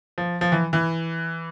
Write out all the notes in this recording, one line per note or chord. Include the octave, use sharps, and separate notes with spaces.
F3
F3
E3
E3